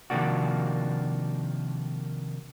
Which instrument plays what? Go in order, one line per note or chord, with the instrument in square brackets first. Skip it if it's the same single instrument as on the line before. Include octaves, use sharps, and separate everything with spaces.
[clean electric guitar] C3 D#3 F3 A#3 D4 F#4